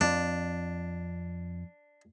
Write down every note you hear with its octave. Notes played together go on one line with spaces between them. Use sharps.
F2 D4